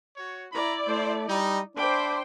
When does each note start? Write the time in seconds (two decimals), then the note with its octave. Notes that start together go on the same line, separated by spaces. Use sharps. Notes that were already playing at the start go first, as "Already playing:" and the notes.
0.17 F#4 C#5
0.53 E4 D5 A#5 B5
0.88 A3 C5
1.29 G3 D#4
1.77 D4 C5 E5 G5 B5 D6